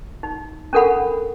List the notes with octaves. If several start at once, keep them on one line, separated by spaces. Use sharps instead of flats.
D#4
C#4 D4 A4 A#4 F#5 B5